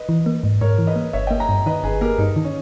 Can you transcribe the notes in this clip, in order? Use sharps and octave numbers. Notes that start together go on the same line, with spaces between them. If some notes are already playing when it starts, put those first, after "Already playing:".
Already playing: B4 D#5
E3
A#3
G#2
G#2 A#4 C#5
E3
B4 D#5
A#3
G1 C#5 E5
A#3 D#5 G5
G5 A#5
G2
D#3 B4 D#5
G1 G#4 B4
A#3 G4 A#4
G2 D#4
D#3
C#4